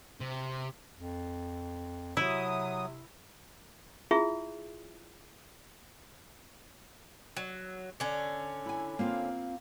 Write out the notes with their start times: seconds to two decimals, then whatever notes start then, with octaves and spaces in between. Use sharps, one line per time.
0.20 C3
0.96 F2
2.17 C3 F#3 E4 D#6
4.11 E4 F4 G#4 E5
7.37 F#3
8.00 D3 C#4
8.66 E4 G#5
8.99 A#3 C4 F4